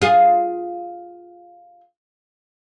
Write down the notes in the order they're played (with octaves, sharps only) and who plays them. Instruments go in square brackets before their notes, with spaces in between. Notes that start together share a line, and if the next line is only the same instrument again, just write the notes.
[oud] F4 G#4